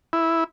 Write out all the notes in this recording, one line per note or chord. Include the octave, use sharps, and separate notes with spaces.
E4